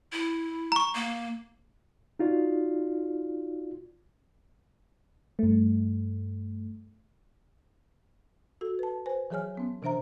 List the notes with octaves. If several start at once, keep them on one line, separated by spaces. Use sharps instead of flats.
E4
A#5 C#6
A#3
D#4 F4 F#4 D5
G2 A3
F#4 A4
B4 A5
B4 C5 G#5
E3 F#3 G#4 C#5 G#5 F6
F#3 B3 C#4
C3 E3 D4 C5 E5 A#5